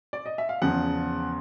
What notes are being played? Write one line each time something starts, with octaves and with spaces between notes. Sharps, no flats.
D5
D#5
E5
F5
E2 C#3 F3 F#5